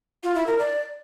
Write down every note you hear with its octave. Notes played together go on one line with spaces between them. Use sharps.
F4
E4
A#4
D5